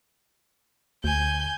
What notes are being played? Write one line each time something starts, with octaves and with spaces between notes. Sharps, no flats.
D2 G#5 G6